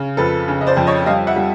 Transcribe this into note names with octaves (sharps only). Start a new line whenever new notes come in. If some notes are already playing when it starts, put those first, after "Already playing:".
Already playing: C#3
F2 A4 B4
C#3
D#5
C5 D5
F2
C#5 D#5
G3 D#5 F5
E5 F#5
G3